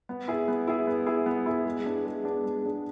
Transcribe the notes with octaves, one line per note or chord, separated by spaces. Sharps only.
B3
E4 G#4
B3
E4 G#4
B3
E4 G#4
B3
E4 G#4
G#3
B3 D4 G#4
G#3
B3 D4 G#4
G#3
B3 D4 G#4